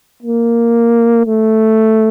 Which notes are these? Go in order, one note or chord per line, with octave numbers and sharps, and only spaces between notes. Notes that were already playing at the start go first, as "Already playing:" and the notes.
A#3
A3